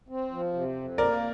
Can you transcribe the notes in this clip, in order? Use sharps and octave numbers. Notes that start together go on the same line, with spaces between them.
C4
F3
C3
F2
A#3 A#4 D5